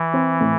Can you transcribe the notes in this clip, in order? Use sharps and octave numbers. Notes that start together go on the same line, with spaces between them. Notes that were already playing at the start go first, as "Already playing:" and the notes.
Already playing: E3
C4
A2